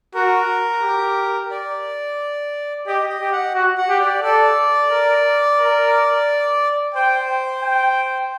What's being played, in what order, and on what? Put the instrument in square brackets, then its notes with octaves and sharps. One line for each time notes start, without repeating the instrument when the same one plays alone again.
[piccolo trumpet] F#4 [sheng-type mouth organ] A#4
[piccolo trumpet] G4
[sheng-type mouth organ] D5
[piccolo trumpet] G4 [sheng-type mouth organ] D#5
[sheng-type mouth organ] D#5
[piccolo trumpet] G4
[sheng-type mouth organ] F#5
[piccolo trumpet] F#4
[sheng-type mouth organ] F#5
[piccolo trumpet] G4
[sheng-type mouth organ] D5
[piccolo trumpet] A4 [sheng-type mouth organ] D5
[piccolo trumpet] A#4
A#4
[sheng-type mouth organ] C5 [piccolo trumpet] G5
[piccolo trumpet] G5